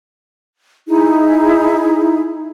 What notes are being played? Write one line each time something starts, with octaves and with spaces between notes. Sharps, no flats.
D#4 E4 G#4